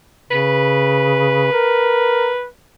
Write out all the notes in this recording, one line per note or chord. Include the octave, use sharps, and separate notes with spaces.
C#3 B4
A#4